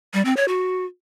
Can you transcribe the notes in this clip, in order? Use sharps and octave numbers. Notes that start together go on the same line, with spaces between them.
G3
C4
C#5
F#4